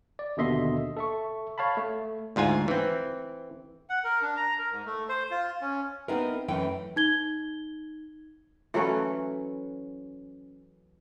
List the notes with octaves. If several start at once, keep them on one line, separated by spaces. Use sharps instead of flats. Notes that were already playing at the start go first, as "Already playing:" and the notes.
D5
D#2 B2 D3 D#5 E5 C6
A4 E5 C#6
C#5 F5 A5 B5
A3
D2 G#2 F4 G#5
E3 C4
F#5
A#4
D4
A#5
A#4
G#2
A3
C5
F4
C#4
B3 C4 D#4 E4 A#4
F#2 E3 A3 G5
D#4 G#6 G7
E3 F#3 A3 C#4